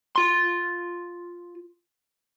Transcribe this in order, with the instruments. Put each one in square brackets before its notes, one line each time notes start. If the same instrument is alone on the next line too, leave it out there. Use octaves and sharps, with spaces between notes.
[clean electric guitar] F4 C6